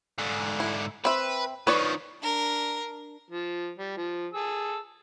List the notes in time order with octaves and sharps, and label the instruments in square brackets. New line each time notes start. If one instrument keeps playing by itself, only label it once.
[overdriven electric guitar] G#2 D3
[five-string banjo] E4
[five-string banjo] C4 E5 [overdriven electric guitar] B4
[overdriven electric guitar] D#3 F3 [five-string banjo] B4 C#5 D5
[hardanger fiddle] D4 A#4
[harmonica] F3
G3
F3
G#4 A5 E6